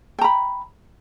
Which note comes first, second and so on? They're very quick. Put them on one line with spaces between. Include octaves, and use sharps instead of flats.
G5 A#5 B5